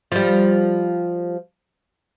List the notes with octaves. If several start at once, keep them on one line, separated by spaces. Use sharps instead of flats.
F3 G3